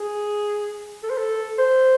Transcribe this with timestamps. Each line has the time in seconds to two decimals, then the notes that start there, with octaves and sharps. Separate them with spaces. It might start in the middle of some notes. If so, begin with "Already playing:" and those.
Already playing: G#4
1.03 A4
1.10 C5
1.18 A4
1.58 C5